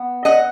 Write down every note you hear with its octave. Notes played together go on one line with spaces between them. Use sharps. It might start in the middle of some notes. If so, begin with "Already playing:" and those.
Already playing: B3
D#5 F#5